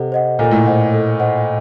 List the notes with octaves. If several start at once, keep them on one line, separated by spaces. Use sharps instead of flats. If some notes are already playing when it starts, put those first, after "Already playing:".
Already playing: C3 A4 C5 D#5 F#5
C5 D#5 F#5
A#2 A4
A2
A#2 C5 D#5 F#5
A4
C5 D#5 F#5